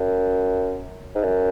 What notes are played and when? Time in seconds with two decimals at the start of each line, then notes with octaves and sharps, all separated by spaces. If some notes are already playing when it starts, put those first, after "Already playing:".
Already playing: F#2
1.15 G#2
1.23 F#2